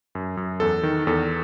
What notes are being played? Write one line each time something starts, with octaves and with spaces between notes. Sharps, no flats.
F#2
F#2
E2 A4
D#3
E2 A4